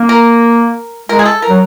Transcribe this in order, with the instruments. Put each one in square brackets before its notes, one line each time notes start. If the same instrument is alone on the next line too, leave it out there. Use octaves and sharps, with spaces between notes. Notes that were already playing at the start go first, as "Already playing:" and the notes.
Already playing: [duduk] A#3
[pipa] A#4
[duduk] G#3 [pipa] A#4
[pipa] G#4
A4
A#4
[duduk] F#3